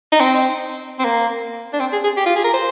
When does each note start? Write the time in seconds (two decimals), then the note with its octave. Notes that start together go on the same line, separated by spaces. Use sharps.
0.12 D#4
0.20 C4
0.99 C4
1.04 A#3
1.73 D4
1.80 C4
1.92 G#4
2.04 G#4
2.17 G4
2.26 F4
2.36 G#4
2.44 A#4
2.54 C5